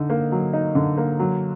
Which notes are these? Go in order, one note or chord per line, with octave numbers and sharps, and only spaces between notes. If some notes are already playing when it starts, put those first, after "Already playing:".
Already playing: D3 D#4
A#3
F#3
D#4
D3
A#3
F#3